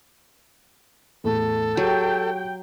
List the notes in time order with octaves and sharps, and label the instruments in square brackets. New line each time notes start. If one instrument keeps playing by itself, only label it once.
[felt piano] E2 A2 [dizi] A4
[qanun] F#3 [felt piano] G4 G#4 [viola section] G5